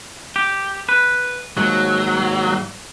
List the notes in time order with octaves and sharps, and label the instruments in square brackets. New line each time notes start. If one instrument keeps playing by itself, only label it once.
[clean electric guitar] G4
B4
[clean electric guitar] D#2 G#2 [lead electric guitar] F#3